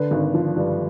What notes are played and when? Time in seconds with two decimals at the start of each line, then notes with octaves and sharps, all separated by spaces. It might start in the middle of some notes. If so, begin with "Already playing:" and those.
Already playing: D3 B4
0.11 G#1
0.34 F3
0.56 G2